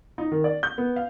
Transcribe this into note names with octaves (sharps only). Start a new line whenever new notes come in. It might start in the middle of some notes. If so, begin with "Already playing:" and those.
D#4
D#3
D5
G6
B3
F5